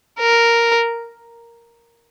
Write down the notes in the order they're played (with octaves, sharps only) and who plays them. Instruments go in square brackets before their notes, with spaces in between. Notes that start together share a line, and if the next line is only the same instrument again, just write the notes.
[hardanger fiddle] A#4